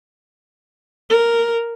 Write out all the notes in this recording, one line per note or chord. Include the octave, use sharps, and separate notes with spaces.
A#4